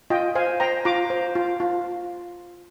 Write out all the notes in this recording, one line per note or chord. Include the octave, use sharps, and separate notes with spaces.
F4 D#5 G5
C5 F5 G#5
C5 G5 A#5
F4 A#5 D6
C5
F4
F4